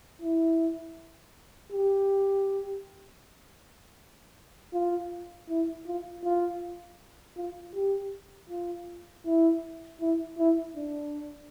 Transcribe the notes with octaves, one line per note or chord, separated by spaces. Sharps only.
E4
G4
F4
E4
F4
F4
F4
G4
F4
E4
E4
E4
D4